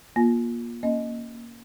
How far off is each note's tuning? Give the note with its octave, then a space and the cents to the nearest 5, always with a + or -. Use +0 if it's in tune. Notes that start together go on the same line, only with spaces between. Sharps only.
A#3 +30 F4 +15
A#3 +0 C#4 +0 D#5 +0